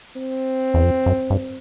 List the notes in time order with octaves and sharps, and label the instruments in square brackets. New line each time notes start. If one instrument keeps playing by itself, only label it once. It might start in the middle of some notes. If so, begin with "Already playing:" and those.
[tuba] C4
[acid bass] E2
F2
F#2
G2